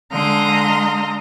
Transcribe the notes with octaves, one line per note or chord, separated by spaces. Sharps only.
D3 G#3 F5 A#5 C6 D#6